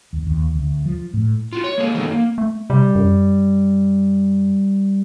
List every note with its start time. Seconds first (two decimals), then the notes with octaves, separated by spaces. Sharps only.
0.13 D#2
0.27 D#2
0.55 D2
0.85 F3
1.14 A2
1.53 F4 F#4
1.64 C#5
1.78 G#3 A#3 G#4
1.94 D#3 F3 F#3 B3 D#4 A4
2.11 A#3
2.38 A3
2.70 C3 G3
2.95 F#2